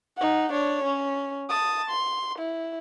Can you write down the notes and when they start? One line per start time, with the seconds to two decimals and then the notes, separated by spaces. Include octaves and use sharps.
0.17 D#4 F#5
0.52 D4 C#5
0.84 C#4
1.50 A5 D#6
1.90 C6
2.38 E4